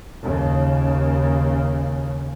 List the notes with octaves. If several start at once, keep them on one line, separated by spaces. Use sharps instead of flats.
D#2 C#3